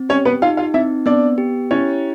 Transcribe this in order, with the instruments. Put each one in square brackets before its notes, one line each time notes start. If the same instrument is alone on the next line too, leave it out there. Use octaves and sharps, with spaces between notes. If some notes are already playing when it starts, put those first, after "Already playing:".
Already playing: [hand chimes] C4
[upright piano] C#4 C#5 [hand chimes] G4
[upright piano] B3 B4
[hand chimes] D#4 [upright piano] F4 F5
[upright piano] F4 F5
[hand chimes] C4 [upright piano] E4 E5
[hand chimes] B3 [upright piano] D4 D5
[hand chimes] G4
[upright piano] C#4 C#5 [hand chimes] E4